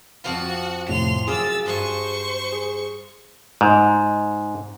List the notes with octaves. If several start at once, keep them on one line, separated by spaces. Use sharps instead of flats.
F2 F3 F#4 F5 F#5
F2 A2 C3 C6 F7
F#2 G#4 D5 F5 E6 A6
G2 C5 D#5 G#5 C#6
G#4
G#2